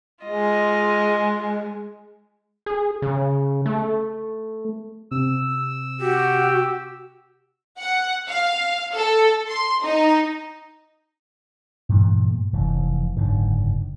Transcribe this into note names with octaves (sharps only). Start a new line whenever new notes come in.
G#3 F4 D#5
G#4
C#3
A3
C3 E6
F#4 G4
F#5
F5
A4
C6
D#4
G2 A#2 E3 A3
F1 E3
F#1 G#2 D3